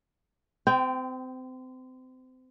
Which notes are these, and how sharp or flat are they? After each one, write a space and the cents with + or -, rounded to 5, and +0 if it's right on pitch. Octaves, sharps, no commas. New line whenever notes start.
C4 -30 G5 +0